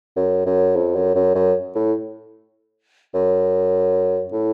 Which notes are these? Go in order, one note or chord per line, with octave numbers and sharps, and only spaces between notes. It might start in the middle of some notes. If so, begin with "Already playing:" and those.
F#2
F#2
F2
F#2
F#2
F#2
A2
F#2
A2